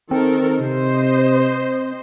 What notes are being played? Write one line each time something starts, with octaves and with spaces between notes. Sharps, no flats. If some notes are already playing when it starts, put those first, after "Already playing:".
D#3 C4 A4 A#4
C3 C5 D#5